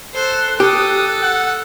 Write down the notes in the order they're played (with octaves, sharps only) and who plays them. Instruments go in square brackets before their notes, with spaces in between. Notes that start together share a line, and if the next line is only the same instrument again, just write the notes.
[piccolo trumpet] A4 [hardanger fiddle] C5 [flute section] F#6
[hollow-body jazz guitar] G4 [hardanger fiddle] A4 [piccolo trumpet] D#6
[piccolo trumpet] F#5